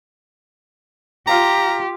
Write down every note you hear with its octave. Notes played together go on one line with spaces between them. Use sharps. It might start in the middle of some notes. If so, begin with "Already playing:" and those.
F4 G4 F5 A#5 D#6